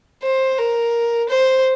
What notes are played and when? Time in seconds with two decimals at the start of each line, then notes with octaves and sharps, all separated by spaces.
0.23 C5
0.58 A#4
1.29 C5